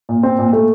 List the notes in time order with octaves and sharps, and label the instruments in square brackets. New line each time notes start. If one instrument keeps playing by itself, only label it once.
[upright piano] A#2
C4
A#2
A3